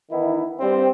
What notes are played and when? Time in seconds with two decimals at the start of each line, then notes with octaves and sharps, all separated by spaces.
0.11 D#3 E3 B3 D#4 E4
0.60 G2 G3 C4